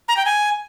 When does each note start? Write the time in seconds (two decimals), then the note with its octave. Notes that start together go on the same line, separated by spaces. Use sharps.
0.08 A#5
0.17 G5
0.25 G#5